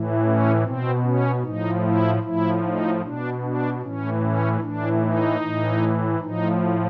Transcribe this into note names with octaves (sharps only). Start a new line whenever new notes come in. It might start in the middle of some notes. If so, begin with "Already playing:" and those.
Already playing: A2 E3
C#4
B2 C4
C#4
A2 F3 D#4
E4
A2 F3 E4
D#4
B2 D4
D4
A2 E3 C#4
C#4
A2 E3 D4
D#4
A2 E3
A2 F3 D#4